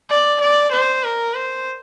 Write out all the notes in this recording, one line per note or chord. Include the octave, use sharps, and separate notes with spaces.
D5
D5
C5
A#4
C5